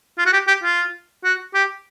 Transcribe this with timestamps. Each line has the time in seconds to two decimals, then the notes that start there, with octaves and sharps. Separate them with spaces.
0.18 F4
0.26 F#4
0.33 G4
0.48 G4
0.64 F4
1.24 F#4
1.54 G4